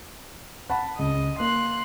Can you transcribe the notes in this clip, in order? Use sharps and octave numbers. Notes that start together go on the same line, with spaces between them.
F#5 A5 B5
C#2 D#5
A#3 C6 F#6